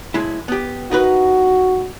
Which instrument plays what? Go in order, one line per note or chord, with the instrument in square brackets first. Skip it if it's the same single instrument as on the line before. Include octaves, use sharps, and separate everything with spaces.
[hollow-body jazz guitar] B1 G#3 E4
B3 G4
[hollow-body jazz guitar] D#4 A#4 B4 [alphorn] F#4